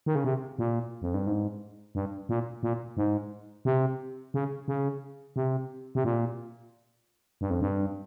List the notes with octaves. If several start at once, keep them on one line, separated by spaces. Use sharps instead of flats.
D#3
C#3
C3
A#2
F2
G2
G#2
G2
A#2
A#2
G#2
C3
C#3
C#3
C3
C3
A#2
G2
F2
G2